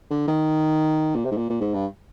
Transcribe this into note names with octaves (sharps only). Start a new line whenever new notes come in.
D3
D#3
A#2
C3
G#2
A#2
A#2
G#2
G2